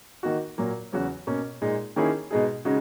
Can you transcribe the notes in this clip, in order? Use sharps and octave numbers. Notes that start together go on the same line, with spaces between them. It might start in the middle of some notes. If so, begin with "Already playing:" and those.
D#3 A#3 D#4 F#4
A#2 F#3 A#3
E2 C#3 F#3 C#4 F#4
B2 A#3 C#4
A#2 G#3 D#4
D#3 A#3 C#4 E4 G#4
B2 G#3 D#4 G#4
C#3 G#3 D#4 F#4